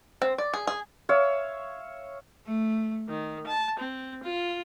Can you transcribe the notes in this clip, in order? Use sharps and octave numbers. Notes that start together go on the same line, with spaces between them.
C4
D5
G#4
G#4
C#5 E5 F5
A3
D#3
A5
C4
F4